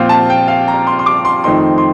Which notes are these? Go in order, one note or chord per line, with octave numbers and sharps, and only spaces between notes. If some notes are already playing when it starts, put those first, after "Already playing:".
Already playing: A#2 F3 C4 F4 F5
A5
G5
F5
A#5
C6
C6
D6
C6
F2 D#3 A3 C4 D#4 C6
C6